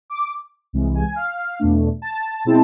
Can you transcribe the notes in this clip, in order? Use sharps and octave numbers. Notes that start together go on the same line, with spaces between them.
D6
C2 C3 E3 G#3
G#5
F5
E2 B2 A3 D4
A5
B2 G#3 C4 E4